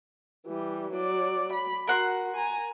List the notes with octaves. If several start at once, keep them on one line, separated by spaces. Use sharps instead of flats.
E3 G3
F#3 D5
B5
F#4 A#4 F#5 C6
G#5 A#5